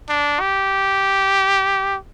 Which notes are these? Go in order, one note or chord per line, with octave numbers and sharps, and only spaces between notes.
D4
G4